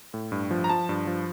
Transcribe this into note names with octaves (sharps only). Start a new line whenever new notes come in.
A2
G2
F3
A#5
F3 A5
G2
F3